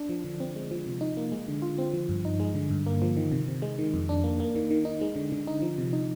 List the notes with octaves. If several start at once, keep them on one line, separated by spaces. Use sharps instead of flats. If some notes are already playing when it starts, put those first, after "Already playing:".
Already playing: D4
F3
D3
C4
G#3
F3
C3
D#4
A#3
G#3
D3
F4
C4
F3
G2
D#4
G#3
D3
G2
A#3
F3
D#3
C3
C3
G#3
D#3
F2
D4
A#3
A#3
D#3
D#3
D#4
G#3
D3
D3
D#4
F3
C3
D#4